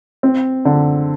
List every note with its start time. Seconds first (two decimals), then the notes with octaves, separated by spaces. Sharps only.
0.23 C4
0.65 D3